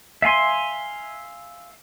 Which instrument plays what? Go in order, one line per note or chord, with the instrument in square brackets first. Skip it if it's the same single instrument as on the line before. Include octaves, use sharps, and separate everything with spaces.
[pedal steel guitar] E5 F5 G#5 C6